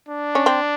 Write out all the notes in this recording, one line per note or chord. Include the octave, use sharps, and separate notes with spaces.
D4
C#4
C4